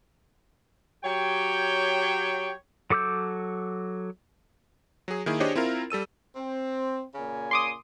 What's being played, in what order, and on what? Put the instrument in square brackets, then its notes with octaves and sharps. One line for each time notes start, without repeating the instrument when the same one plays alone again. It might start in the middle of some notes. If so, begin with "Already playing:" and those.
[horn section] F#3 G4 C#5 G5
[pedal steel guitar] F#3 A4 D6 E6 G6
[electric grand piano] F#3 G#4
D#3 A#3 E4 G#4
D4 G4 G#4 C5 C#5 D#5
C4 E4 F4 A#4
G3 A4 E6 D#7
[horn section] C4
A#2 C#3 G#5
[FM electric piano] C6 D6 D#6